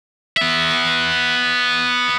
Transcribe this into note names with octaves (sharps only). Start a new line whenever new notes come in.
B3 E5